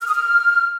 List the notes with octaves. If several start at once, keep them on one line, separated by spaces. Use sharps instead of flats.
F6
D#6
F6